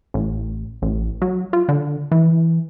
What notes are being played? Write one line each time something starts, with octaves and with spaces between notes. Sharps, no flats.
A1
A1
F#3
F4
D3
E3